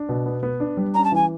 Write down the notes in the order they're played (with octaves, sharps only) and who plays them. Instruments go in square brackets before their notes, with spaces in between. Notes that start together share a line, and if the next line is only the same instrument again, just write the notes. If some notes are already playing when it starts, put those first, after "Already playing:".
Already playing: [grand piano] D4
B2
B3
B3
D4
G3
[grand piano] C#4 [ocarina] A#5
[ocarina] A5
[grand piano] E3 [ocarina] G#5